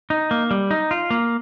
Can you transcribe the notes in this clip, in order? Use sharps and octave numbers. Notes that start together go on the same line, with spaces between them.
D#4
A#3
G3
D#4
F4
A#3